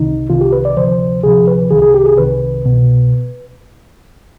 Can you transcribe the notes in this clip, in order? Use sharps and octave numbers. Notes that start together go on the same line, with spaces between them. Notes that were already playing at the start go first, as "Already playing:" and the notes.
Already playing: C2 C3 D#3 D#4
C2 C3 D#3 F4
G4
B4
D5
D2 C3 F3 C5
D2 C3 F3 G#4
B4
C2 C3 D#3 G#4
G#4
G4
G#4
C2 C3 D#3 B4
C2 B2